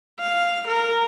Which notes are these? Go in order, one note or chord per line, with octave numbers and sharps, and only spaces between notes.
F5
A#4